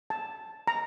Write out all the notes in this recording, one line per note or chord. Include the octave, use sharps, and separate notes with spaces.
A5
A#5